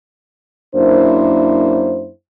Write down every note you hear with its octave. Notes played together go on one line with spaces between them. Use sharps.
F#2 A#3 D4 E4 C5